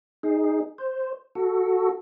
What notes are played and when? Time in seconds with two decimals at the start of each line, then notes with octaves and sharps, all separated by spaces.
0.23 D#4 G#4
0.78 C5
1.35 F#4 A4